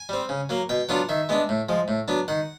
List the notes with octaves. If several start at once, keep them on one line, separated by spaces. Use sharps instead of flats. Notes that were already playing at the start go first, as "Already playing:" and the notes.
Already playing: G#5
G3 C4
C#3
F#3 A#3
B2 G5
F#3 B3 D4 F4 F#5
D#3 E5
G#3 B3 D4
A2
F3 G#3
A2
F#3 B3 D4
D#3 F#5